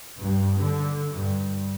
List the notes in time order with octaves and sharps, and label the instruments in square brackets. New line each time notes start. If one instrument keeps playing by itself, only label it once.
[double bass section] G2
D3
G2